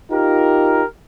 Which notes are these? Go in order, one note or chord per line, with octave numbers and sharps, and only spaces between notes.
D#4 F4 G4 A#4